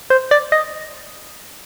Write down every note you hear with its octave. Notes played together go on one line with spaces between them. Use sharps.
C5
D5
D#5